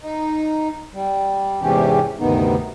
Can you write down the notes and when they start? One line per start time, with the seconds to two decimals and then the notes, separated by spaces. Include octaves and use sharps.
0.01 D#4
0.94 G3
1.61 E2 G#2 C3 E3 C#4 G4
2.20 D2 G2 C3 D#3 B3 D#4